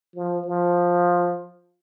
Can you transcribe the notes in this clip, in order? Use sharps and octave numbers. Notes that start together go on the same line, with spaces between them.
F3
F3